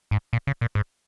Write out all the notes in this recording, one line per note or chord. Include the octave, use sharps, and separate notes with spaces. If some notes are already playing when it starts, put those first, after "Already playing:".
G#2
A#2
C#3
A#2
G#2